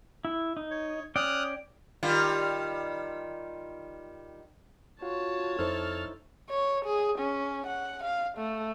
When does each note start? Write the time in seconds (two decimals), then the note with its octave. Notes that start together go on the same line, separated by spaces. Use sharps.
0.25 E4
0.57 D#4
0.71 C#5
1.16 C#4 D5 G5 D#6 F6 F#6
2.03 D#3 G3 F4
5.02 F4 F#4 C#5 A5
5.59 F2 D#4 E4 A4 C5 F6
6.50 C#5
6.86 G#4
7.19 C#4
7.67 F#5
8.04 F5
8.38 A3